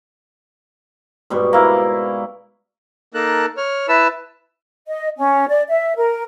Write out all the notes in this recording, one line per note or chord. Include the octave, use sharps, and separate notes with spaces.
G#2 B2 G3
A#3 E4
A#3 D#4 A4 A#4 A5 F#6
C#5 F6
E4 B4 A5 E6
D#5
C#4
D5
E5
A#4